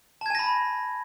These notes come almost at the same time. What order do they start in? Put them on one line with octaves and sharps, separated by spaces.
A5 G#6 G#5 A#6 B5